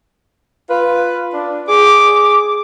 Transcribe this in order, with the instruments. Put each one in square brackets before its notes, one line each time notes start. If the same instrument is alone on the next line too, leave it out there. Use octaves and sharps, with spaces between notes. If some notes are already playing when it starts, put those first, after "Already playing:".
[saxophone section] F4 B4
D4
[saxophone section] G#4 [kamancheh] D6